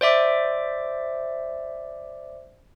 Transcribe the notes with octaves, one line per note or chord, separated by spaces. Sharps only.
C5 D5 E5 D6